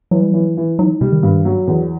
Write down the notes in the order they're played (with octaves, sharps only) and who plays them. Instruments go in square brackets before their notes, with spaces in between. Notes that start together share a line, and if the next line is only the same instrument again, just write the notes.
[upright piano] E3 [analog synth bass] F#3
[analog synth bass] G3
[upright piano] E3 [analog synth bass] F#3
[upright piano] E3
[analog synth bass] F#3 [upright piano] D#4
[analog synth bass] C3 [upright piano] G3
[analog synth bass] D#3
[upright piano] G2
F#3
E2